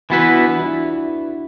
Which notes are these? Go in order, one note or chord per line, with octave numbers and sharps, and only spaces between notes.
E3 B3 E4 F#4 B4
D4
E4